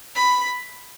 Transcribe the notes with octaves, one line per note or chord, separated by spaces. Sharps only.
B5